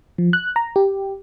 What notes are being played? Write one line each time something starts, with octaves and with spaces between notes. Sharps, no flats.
F3
F#6
A#5
G4